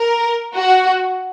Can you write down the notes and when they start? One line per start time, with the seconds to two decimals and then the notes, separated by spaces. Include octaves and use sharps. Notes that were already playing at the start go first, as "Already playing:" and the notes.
Already playing: A#4
0.56 F#4